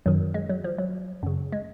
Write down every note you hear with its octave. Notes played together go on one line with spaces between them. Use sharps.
F#2 D#3 F#3
G#3
F#3
F3
F#3
F#2 C#3
G#3